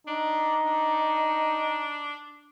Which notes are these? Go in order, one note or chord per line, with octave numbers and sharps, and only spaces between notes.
D4 D#4
D4